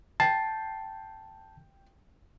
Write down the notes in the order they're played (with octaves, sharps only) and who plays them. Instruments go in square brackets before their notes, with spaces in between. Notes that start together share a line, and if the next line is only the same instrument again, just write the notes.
[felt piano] G5 C7 [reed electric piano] A5